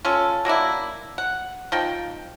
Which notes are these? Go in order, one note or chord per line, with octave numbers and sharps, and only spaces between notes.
C#4 F4 A4
F#3 A#3 D4 E4
F#5
F3 D#4 G5